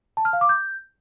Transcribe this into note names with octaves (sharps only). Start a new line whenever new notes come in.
A5
F6
F5
D6
G6